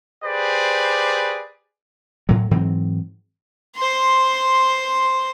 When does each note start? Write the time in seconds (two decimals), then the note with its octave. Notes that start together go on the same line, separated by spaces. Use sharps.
0.25 G4 G#4 B4 C5 D5
2.29 A2 F#3
2.51 G#2 E3 F#3 C4
3.76 C5 C6